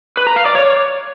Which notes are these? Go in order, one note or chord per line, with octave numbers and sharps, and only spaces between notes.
B4
A#5
F5
D5
C#5